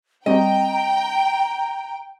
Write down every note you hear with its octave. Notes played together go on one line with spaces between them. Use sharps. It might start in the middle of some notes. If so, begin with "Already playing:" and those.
G3 C4 F#4 D#5 G5 A#5